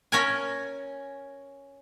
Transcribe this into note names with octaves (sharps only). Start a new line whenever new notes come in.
C#4 A#4 G#5